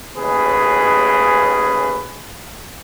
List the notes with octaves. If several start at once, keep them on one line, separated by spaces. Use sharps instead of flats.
A1 D#2 C#3 G#4 B4